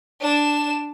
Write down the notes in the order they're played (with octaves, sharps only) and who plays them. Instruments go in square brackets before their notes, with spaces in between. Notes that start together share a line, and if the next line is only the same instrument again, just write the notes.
[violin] D4 E7